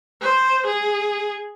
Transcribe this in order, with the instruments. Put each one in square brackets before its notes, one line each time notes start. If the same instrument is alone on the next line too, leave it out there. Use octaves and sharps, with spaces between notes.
[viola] C5
G#4